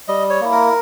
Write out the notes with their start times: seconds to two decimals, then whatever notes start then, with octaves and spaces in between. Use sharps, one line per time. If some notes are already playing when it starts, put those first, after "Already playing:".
0.08 G3 D#5
0.30 C#5
0.41 A#3 E4
0.52 A#4